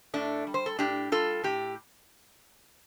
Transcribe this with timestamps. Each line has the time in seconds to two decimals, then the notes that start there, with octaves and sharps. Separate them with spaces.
0.14 A2 A3 D4
0.47 G3
0.54 C5
0.66 A4
0.79 A2 D4 G4
1.12 G3 F4 A4
1.44 A2 G4